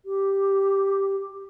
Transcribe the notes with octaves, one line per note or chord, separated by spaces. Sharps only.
G4